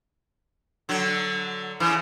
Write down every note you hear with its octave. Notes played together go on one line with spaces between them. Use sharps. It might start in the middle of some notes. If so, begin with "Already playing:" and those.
D3 F#3
C#3 E3